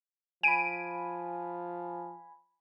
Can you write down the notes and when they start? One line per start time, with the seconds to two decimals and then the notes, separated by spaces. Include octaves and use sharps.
0.43 F3 G#5 B5 D7 D#7